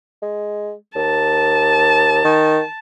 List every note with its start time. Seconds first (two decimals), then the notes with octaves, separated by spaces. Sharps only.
0.22 G#3
0.96 D#2 A5
2.24 D#3